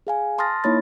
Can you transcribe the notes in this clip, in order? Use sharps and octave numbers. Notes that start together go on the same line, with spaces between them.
G#4 F5 G#5
A5 C6 D#6 F6 A6 A#6
A#3 D#4 E4 C#5 B5 A6